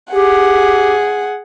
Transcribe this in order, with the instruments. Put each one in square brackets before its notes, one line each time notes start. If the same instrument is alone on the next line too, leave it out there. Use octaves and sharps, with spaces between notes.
[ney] G4 [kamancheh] G#4 F#5